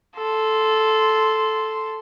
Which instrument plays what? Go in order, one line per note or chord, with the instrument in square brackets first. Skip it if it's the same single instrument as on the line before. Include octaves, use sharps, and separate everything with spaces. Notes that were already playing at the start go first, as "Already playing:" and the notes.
[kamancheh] A4 C6